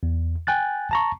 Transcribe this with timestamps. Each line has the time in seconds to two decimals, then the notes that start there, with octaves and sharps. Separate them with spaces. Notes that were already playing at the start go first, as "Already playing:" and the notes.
0.03 E2
0.47 G5 G#5 F#6 A6
0.91 A5 A#5 C#6